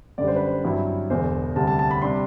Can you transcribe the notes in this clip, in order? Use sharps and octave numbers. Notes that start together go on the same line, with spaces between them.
F#2 D3 G3 D4 D5
C5
B4
C5
G2 F#3 C4 E4
E1 E2 D3 C5
D2 C3 G3 A5
A5
A5
B5
C3 G3 D4 C6